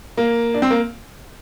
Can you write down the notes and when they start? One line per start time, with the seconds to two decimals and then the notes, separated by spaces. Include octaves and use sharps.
0.17 A#3
0.54 D4
0.62 C4
0.70 A#3